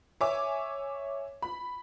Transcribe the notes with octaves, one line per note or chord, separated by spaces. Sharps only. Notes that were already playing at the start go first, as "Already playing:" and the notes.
C#5 E5 G#5 D6
B5